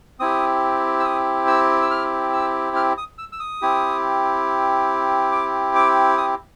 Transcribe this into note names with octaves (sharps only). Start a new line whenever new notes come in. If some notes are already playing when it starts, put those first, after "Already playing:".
C4 E4 G4 D#6
E6
D#6
E6
E6
F6
E6
F6
D#6
E6
E6
D#6
C4 E4 G4
D6
D6
D#6